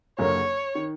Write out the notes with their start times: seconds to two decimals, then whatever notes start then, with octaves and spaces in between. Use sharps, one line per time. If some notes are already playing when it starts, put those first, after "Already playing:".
0.19 F#1 F#2 D3 F#3 A#3 C#5
0.75 D#3